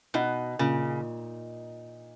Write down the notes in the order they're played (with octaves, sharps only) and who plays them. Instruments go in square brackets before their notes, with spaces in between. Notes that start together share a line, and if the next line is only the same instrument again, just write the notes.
[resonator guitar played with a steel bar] B2 [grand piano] D#4
[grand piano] A#2 [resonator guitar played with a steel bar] C#3